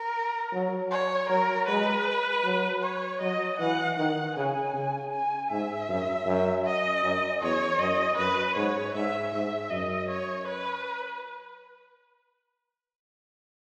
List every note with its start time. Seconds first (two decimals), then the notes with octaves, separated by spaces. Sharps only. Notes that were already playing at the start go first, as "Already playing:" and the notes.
Already playing: A#4
0.53 F#3
0.91 C#5
1.29 F#3 A#4
1.68 G#3 B4
2.44 F#3
2.83 C#5
3.21 F#3 D#5
3.59 E3 F#5
3.97 D#3 F#5
4.36 C#3 G#5
4.73 C#3
5.12 G#5
5.51 G#2 E5
5.89 F#2
6.27 F#2
6.65 D#5
7.03 F#2
7.41 E2 C#5
7.79 F#2 D#5
8.18 F#2 B4
8.56 G#2 C#5
8.94 G#2 E5
9.32 G#2 E5
9.70 F#2 D#5
10.10 C#5
10.48 B4